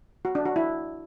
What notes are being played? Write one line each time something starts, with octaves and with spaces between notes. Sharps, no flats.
F#4
D4
F#4
E4